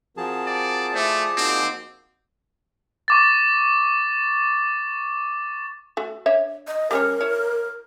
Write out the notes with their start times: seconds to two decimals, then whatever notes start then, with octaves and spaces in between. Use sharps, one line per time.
0.17 F3 C4 F#4 G#4 A#4 A5
0.46 D5
0.95 A3 E4 C5 D5 E5
1.37 A#3 C4 D#4 F#4
3.08 C#6 D6 A6
5.97 A3 F#4
6.26 D4 C#5 E5
6.68 D#5
6.91 G3 C#4 A#4 C#5
7.21 E4 C#5